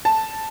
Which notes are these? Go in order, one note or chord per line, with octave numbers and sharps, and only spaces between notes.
A5